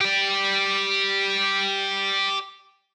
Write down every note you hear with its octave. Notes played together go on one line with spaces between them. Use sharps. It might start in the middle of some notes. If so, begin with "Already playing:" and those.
G4 D5